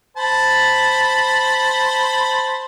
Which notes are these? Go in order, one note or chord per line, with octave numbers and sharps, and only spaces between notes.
C5 A5 B5